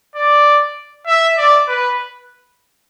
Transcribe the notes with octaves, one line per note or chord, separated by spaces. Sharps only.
D5
E5
D5
B4